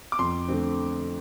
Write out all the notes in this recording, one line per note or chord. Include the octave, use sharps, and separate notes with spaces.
D6
F2 C6
D3 A3 C4